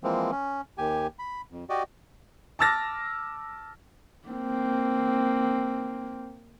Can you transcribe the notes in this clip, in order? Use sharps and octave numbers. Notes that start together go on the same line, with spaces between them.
E3 F3 G#3 A#3 C4
C#4
D#2 G4 G#5
B5
F2
F#4 G4 D5 D#5
A5 D6 E6 F6 A6 A#6
A#3 C4